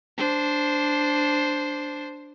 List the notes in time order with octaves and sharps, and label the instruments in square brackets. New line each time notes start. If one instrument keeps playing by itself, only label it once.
[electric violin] D4 C5